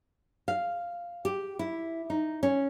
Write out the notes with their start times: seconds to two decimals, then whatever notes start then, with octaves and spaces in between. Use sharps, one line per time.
0.48 F5
1.25 G4
1.59 E4
2.10 D#4
2.43 C#4